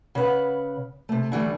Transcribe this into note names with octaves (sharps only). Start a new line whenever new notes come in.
C#3 B4 F#5
C3 A3
D3 E3 G3 A3